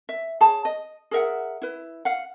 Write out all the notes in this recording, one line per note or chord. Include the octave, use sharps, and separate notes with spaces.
E5
G#4 C#5 A5
D#5
G#4 A#4 E5 F#5
E4 B4
F5 F#5